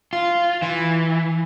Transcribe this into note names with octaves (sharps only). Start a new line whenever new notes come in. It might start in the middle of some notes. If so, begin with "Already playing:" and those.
F4
E3